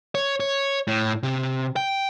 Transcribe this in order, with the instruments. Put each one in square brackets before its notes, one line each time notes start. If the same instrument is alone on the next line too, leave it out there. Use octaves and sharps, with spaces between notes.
[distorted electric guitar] C#5
C#5
A2
C3
G5